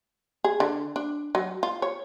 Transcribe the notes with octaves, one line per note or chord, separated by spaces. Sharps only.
G#4
D3
D4
F#3
F4
C#5